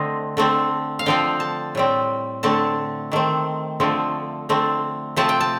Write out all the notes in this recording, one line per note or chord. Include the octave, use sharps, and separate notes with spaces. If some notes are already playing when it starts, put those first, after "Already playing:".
Already playing: D3 A3 C4 D#5
D3 A3 C4
F5
D3 F3 C4 G5
A5
A2 G3 C4
D3 A3 C4 A5
D#3 A3 C4
D3 F3 A3 C4
D3 A3 C4
C3 F3 A3 C4 A5
G5
A5